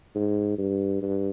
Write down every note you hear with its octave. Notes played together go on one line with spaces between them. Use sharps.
G#2
G2
G2